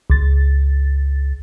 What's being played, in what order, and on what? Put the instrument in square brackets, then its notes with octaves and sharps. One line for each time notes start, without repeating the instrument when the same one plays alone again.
[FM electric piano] C#2 A6